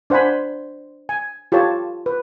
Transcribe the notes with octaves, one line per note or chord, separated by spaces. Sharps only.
D4 C5 F#5 G#5 B5
G#5
F4 G4 A4 C#5 A5
B4